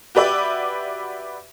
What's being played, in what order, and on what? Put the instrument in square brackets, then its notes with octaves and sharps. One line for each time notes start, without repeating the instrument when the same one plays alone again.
[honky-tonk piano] F#4 G4 B4 D5 E5 D6